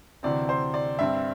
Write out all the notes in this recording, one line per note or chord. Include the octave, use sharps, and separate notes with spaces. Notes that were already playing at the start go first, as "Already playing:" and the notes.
D2 C3 E3 C4 D5
C5
D5
G2 G3 C4 E5